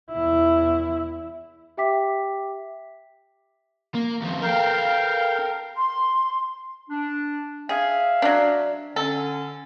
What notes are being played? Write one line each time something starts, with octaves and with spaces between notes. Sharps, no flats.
E2 E4
G4 E5 G5 D6 B6
A#3
D#2 F3
A4 A#4 F5 G5
C6
D4
G#4 E5 F5
F#3 D4
D3 C#4 A4